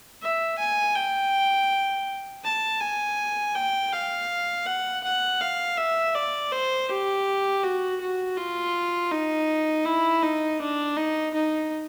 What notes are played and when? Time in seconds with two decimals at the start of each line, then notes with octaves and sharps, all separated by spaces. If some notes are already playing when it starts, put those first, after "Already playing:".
0.22 E5
0.59 G#5
0.96 G5
2.44 A5
2.81 G#5
3.55 G5
3.93 F5
4.67 F#5
5.04 F#5
5.41 F5
5.77 E5
6.15 D5
6.52 C5
6.89 G4
7.63 F#4
8.01 F#4
8.37 F4
9.12 D#4
9.86 E4
10.23 D#4
10.60 D4
10.97 D#4
11.34 D#4